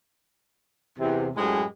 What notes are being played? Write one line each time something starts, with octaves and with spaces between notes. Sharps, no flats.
E2 C3
F#2 A2 G#3 G4 G#4 B4